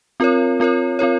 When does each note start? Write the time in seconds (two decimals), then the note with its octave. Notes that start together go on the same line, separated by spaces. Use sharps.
0.20 C4 F4 A#4 C#5
0.60 C4 F4 A#4 C#5
0.99 C4 F4 A#4 C#5